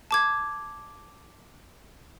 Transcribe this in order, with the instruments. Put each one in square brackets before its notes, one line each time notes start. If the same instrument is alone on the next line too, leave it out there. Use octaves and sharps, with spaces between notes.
[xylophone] A5 D6 G#6